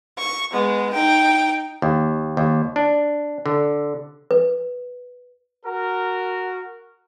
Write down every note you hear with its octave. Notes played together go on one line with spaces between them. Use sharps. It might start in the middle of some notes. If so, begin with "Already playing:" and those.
C#6
G#3 B3
D#4 G5
D#2
D#2
D4
D3
B4
F#4 A#4